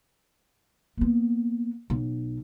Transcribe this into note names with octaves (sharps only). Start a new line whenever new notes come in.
A#3 B3
B1